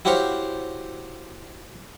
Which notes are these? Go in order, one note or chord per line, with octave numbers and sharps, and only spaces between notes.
E4 F#4 G4 C5 C#5 F5